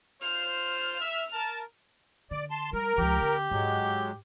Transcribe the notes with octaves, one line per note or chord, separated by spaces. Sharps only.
F4 C5 F6
E5
A#4 A5
D3 D5
A5 C6
G3 A#4
C#2 F3 G4
D3 C4
G#2 F#3 G#3